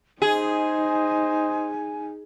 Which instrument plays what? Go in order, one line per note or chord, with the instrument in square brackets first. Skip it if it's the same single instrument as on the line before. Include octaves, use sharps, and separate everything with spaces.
[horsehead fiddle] D#4 [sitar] G#4 [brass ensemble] C5 D#5 [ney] G#5